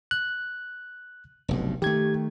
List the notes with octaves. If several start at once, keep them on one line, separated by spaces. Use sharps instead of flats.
F#6
F1 B1 G2
D#3 A3 G4 G#6